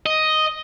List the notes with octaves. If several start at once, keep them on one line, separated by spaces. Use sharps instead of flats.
D#5